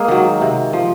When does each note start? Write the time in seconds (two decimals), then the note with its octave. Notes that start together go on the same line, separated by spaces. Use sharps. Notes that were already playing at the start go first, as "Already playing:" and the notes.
Already playing: G#3 A#3
0.08 D#3 F#3
0.41 C3
0.73 F3